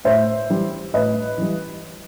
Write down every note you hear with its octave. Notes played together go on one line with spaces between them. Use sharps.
A2 C5 E5
E3 G3
A2 B4 D#5
E3 G3